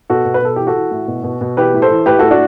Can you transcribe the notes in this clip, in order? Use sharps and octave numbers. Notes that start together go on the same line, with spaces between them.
B2 F#4 A4
B2
B4
B2 A4
E3 G4
F#4 A4
E3
A2
B2
B2
B2
E3 G4 B4
A2
A4 C5
E3
A2 G4 B4
A2 F#4 A4
D4 F#4